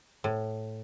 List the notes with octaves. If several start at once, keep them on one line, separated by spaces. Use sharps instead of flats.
A2